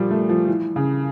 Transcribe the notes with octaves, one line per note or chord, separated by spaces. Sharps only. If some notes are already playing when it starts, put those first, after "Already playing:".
Already playing: A#2 F3 G3
A3
F3
E3
C#3